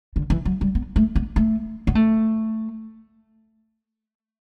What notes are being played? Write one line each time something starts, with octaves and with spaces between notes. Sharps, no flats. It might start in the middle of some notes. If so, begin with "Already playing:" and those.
D3
E3
F#3
G3
B3
A3
B3
A3
B3
A3